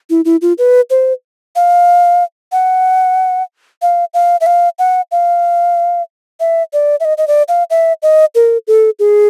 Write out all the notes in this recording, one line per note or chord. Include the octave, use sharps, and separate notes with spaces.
E4
E4
F4
B4
C5
F5
F#5
F5
F5
E5
F5
F#5
F5
E5
D5
E5
D#5
D#5
D5
F5
E5
D#5
A#4
A4
G#4